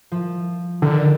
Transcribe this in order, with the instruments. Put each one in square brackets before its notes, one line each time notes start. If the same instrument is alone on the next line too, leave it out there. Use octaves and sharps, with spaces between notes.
[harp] F3
[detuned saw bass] D3 [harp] D#3